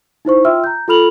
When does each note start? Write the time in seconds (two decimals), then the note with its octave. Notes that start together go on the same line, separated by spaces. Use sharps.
0.25 D#4 E4 C5 C#6
0.44 F4 E5 G5 C6 E6 F6
0.64 A#5 G6
0.88 F4 A4 B5 F6 F7 F#7